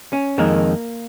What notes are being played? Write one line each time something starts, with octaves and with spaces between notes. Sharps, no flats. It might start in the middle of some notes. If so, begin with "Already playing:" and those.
C#4
F2 D#3 G#3 A#3